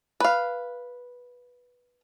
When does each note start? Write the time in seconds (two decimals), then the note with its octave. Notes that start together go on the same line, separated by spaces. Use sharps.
0.20 B4 F5